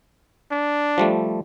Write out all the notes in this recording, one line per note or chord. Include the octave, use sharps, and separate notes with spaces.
D4
F3 G3 A3